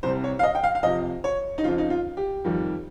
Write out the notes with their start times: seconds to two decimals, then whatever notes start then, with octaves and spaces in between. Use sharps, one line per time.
0.03 C2 C3 G3 C5
0.24 C#5
0.39 F5
0.43 D#5
0.55 G5
0.64 F5
0.75 F5
0.83 F2 C3 F3 D#5
1.24 C#5
1.58 D#4
1.63 F2 C#3 F3 F4
1.78 D#4
1.90 F4
2.17 G4
2.44 F2 D#3 G3